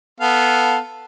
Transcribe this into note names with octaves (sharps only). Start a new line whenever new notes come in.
B3 A4 F5